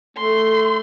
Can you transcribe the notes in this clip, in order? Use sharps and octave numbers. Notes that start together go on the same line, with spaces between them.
A3 C6